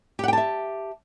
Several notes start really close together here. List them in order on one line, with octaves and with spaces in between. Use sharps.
G4 F#5 G5 A5 E5